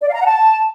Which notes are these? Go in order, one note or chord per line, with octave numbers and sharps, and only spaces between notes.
D5
F5
A#5
F#5
A5